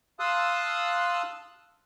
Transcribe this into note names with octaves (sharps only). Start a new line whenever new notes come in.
F5 A5 C6 D#6 E6 F#6